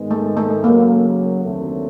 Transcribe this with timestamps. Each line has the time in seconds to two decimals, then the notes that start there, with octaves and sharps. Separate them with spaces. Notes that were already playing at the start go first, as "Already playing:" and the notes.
Already playing: G#2 D#3 G#3 B3
0.11 A3
0.37 A3
0.64 F#2 C#3 F#3 A#3
1.44 D#2 D3 F#3 A3 C4